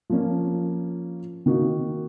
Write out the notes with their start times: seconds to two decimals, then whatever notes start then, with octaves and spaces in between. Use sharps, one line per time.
0.10 F3 A#3 C#4
1.46 D#3 A#3 D#4 F#4